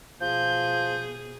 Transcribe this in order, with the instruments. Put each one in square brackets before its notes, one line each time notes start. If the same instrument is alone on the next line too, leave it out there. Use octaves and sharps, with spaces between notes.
[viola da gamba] B2 G#4 [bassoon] F3 [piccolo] G6